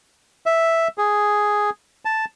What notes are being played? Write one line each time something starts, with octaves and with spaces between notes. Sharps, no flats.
E5
G#4
A5